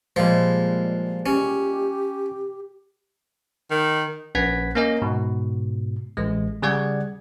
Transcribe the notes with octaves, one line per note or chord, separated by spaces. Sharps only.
A#2 F3 G3 G#3
C#4 G4
D#3
A#1 C#4 B4 F#5 G#6 B6
A#3 C#4 A#4 D#5
G#2 B2
A1 G#3
C#3 G3 G#4 D5 F#5 G#6